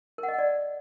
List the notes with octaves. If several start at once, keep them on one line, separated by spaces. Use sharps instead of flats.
A#4
F#5
D#5
F#5
D5